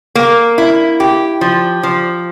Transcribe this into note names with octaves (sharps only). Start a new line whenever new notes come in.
A#3
E4
G4
F3
F3